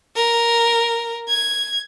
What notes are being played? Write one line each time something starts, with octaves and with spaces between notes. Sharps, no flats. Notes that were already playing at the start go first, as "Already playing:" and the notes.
A#4
G#6